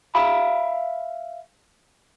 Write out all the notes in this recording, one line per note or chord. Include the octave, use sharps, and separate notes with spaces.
E5 F5 B5